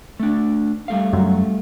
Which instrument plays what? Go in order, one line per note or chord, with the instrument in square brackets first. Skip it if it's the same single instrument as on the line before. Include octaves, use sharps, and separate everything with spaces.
[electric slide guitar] A3 D4
G3 A3 F5
[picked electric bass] F#2 F#3